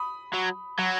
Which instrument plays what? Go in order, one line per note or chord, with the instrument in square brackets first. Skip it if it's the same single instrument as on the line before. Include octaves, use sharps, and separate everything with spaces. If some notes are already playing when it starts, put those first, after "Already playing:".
Already playing: [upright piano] B5 D#6
[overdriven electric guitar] F#3
F#3